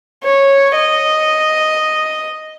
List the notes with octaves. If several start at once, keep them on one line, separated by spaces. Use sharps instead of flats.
C#5
D#5